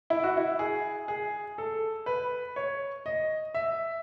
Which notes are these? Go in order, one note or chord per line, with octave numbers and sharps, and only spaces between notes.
E4
F#4
E4
G#4
G#4
A4
B4
C#5
D#5
E5